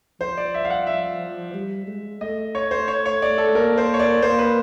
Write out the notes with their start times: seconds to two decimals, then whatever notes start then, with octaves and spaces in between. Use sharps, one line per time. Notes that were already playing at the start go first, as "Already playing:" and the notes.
0.21 F3 C5
0.37 D5
0.54 E5
0.65 F5
0.70 F#5
0.87 E5
1.54 G3
1.87 G#3
2.21 A3 D#5
2.55 C#5
2.71 C5
2.88 C#5
3.06 C#5
3.22 D5
3.38 A4
3.55 A#3 A#4
3.78 C5
3.94 C#5
3.99 D5
4.22 A#3 C5
4.39 B4